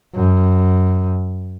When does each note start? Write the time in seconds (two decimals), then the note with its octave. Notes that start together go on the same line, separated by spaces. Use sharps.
0.15 F#2